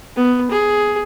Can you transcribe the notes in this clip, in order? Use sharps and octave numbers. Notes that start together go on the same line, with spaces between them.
B3
G#4